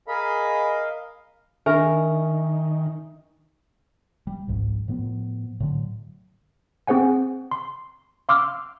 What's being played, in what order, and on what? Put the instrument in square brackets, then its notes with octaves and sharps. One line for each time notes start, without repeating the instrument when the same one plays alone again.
[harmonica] G#4 B5 [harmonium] A#4 D#5 F5
[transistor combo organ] D#3 [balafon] D4 [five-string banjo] A#4 [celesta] E5 G#5 C#6
[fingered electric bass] G3
G#1 C#2 G#2 F3
A2 F3 B3
A2 D3 F#3
[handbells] C4 G#4 C5 F#5 G#5
C6
F5 C6 D6 E6 F6